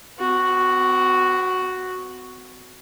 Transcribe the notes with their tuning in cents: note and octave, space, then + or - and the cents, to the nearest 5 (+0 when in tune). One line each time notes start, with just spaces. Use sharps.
C4 -45 F#4 +0